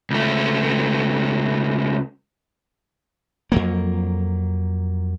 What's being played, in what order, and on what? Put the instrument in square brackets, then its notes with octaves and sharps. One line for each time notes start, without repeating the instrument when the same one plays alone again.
[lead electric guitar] C#2 A3
[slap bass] F2 F#3 A#3